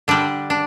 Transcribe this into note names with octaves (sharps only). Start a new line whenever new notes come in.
D3 G3 D4
D4